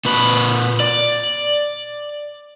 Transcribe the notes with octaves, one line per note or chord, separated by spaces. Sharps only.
A#2 B4
D5